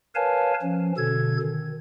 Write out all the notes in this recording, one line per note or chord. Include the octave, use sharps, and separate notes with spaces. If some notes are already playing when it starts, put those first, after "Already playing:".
A#4 B4 C#5 F5 G#5 A5
F3 C#4
B2 D3 A4 G#6
D#3